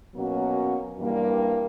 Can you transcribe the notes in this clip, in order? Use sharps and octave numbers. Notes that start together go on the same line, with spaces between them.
B2 F#3 A#3 C#4 F#4
G2 E3 G3 A#3